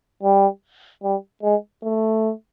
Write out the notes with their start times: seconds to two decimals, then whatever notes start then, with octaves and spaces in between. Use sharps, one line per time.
0.23 G3
1.03 G3
1.43 G#3
1.83 A3